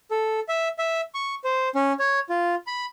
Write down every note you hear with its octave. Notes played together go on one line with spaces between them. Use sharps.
A4
E5
E5
C#6
C5
C#4
C#5
F4
B5